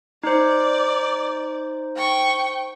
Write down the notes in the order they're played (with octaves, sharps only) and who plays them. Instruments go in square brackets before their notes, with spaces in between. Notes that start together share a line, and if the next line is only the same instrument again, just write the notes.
[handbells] D#4 C5 [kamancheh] D5
[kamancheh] G5 C#6